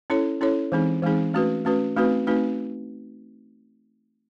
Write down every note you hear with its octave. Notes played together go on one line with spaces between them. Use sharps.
C#4 E4 A4 C#5
C#4 E4 A4 C#5
E3 G#3 C4 D#4 G#4
E3 G#3 C4 D#4 G#4
A3 C#4 F#4 B4
A3 C#4 F#4 B4
A3 C4 D#4 F#4 B4
A3 C4 D#4 F#4 B4